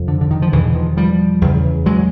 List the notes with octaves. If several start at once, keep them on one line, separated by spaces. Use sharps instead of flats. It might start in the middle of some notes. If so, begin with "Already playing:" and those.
Already playing: F2 C3
D3
D3
D#3
F3
E2 B2 D3 E3
D#3 F3
F3 G3
E2 C#3
F#3 G#3